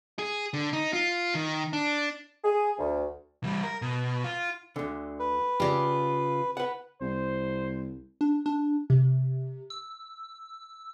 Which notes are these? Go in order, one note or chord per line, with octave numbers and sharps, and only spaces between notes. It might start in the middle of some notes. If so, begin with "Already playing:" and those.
G#4
D3
D#4
F4
D#3
D4
G#4
D2
E3 G3
A#4
B2
F4
D2 D3
B4
C#3 F4 G4 D5
B4 F#5
C2 C5
D4
D4
C3
E6